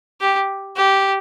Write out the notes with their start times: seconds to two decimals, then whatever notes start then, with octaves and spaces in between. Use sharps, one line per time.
0.21 G4
0.77 G4